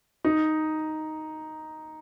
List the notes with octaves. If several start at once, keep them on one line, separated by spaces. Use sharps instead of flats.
D#4